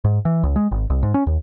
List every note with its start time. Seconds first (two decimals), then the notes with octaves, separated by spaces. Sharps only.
0.04 G#2
0.25 E3
0.43 C#2
0.56 G#3
0.72 G#1
0.90 C2
1.03 G#2
1.14 C#4
1.27 D#2